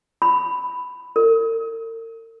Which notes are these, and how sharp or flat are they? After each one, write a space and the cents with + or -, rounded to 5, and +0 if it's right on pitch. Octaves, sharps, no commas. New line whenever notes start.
B5 +10
A#4 -45